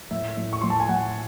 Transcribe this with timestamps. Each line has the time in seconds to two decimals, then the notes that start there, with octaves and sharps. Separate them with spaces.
0.11 A2 E5
0.37 A2
0.53 C#6
0.61 A2 C6
0.70 A5
0.80 G#5
0.89 A2 F#5